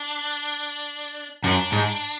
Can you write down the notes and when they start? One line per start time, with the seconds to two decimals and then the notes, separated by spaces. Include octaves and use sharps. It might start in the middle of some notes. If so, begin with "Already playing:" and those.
Already playing: D4
1.44 F#2 D4
1.73 G#2